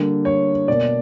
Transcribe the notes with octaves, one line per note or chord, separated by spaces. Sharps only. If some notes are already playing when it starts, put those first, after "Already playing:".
Already playing: D3 G3 A#3
C#5
B2 A#3 D5